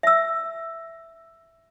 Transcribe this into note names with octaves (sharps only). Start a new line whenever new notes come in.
E5 E6